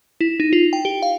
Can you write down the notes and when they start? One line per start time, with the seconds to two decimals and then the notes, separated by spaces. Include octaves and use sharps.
0.21 E4
0.40 D#4
0.53 F4
0.73 G5
0.85 G4
1.02 F5